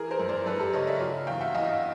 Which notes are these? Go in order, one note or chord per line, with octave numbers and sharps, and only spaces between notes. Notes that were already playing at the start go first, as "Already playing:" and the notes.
Already playing: E3 G#4 A#4
A#4 C5
F#2
C5 D5
F#2 A4 B4
G4 A4
C#3 C#5 D#5
D5 E5
F#3
E2 F5 G5
E5 F#5
E2 D#5 F5